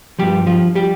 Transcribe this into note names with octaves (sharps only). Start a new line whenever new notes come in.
G2 F3 G3 G4
F3 F4
G3 G4